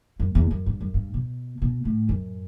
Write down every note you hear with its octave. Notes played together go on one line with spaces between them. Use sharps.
F#2
E2
F#2
G2
F#2
G2
B2
B2
A2
F#2